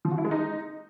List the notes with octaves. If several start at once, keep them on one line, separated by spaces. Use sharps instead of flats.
F3
F#4
E4
G#3
D#4